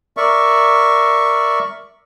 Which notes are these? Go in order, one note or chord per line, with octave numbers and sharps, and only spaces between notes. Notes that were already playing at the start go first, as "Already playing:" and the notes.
A#4 D5 E5 C#6